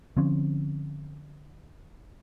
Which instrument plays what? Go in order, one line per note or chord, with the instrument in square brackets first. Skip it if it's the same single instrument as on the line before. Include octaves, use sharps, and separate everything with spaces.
[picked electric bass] D3 F3 C4 C#4